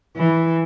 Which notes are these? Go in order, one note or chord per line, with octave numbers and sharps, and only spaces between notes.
E3